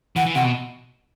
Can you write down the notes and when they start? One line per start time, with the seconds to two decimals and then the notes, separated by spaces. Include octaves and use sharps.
0.16 E3 F#5
0.26 E3
0.35 C3 F#5
0.44 B2